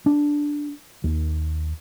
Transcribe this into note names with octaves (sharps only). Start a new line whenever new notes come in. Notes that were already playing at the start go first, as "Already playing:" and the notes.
D4
D#2